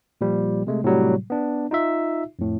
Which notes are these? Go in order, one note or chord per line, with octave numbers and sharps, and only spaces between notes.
A#2 F3 G3
C3 G#3 A3
A2 C3 F#3 G3
B3 D4
D#4 F4 E5
F2 A2